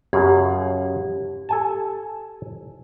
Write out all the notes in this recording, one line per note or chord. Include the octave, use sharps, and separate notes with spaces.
F#2 C#3 G4
A4 G#5 A5